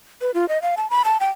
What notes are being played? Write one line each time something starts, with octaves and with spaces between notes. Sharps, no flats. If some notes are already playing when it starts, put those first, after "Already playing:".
B4
F4
D#5
F5
A5
B5
A5
G5